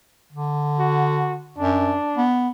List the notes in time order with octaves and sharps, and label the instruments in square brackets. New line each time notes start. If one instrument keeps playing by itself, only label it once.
[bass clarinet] D3
[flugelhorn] F#4
[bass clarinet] F#2 [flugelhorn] D4
[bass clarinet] B3